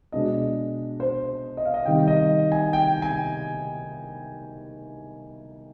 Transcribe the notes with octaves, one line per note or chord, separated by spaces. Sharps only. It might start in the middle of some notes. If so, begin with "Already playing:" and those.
B2 G#3 D4 D#5
C5
D#5
F5
D#5
C3 D#3 G3 G5
D#5
G#5
G5
G#5